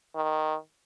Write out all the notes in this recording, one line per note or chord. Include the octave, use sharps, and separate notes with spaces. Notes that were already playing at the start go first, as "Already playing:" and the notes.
D#3